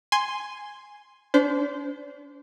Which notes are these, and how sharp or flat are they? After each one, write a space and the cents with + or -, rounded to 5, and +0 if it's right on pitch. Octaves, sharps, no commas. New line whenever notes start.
G#5 +0 C6 +0
D4 -40 C5 -20